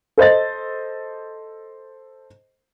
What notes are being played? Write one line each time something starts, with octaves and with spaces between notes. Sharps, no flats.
A4 C5 D#5 A6